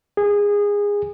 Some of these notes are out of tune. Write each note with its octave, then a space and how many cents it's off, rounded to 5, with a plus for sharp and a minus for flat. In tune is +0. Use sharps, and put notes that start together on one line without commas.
G#4 -20